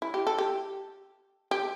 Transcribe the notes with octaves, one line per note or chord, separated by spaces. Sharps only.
E4
G4
A4
G4
G4